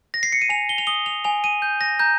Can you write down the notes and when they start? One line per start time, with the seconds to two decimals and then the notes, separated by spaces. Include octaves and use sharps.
0.14 A#6
0.23 C7
0.33 C#7
0.42 D#7
0.49 G#5 F7
0.69 G7
0.78 F7
0.87 D#6 G7
1.06 F7
1.24 G#5 F7
1.44 D#7
1.62 G6
1.81 A#6
1.99 A#5 G6